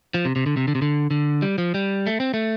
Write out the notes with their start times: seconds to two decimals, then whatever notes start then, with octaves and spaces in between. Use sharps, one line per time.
0.14 F3
0.25 C3
0.36 C3
0.46 D3
0.57 C3
0.68 D3
0.75 C3
0.82 D3
1.11 D3
1.42 G3
1.58 F3
1.74 G3
2.07 A3
2.20 C4
2.34 A3